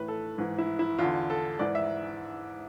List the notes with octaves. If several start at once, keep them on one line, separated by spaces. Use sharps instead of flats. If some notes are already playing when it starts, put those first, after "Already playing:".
Already playing: A2 E3 B4
A4
G#2 E3
E4
E4
E2 D3 F4
A4
G#2 E3 D5
E5